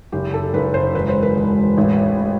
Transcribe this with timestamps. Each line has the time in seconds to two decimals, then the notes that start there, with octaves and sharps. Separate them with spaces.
0.12 F#1 G4
0.34 A4
0.54 F#1 B4
0.74 C5
0.95 E1 B4
1.08 C5
1.23 B4
1.36 E1
1.77 A1